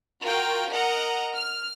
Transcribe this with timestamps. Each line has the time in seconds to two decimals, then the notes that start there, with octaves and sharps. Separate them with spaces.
0.24 F4 F#4 A#4 G5
0.73 A#4 D#5 F#5 A#5
1.34 F6